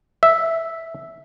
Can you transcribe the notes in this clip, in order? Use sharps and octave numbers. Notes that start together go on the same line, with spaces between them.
E5